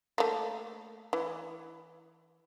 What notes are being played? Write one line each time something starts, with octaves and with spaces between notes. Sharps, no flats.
A3 A#3
E3